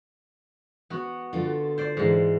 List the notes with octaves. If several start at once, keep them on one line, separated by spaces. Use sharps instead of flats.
B3 F#4
D3 F4 A4
C5 D5
G#2 E3